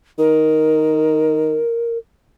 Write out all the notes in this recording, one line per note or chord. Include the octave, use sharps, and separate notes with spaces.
D#3 A#4